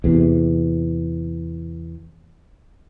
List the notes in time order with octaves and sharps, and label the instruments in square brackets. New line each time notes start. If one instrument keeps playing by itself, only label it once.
[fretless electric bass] E2 C3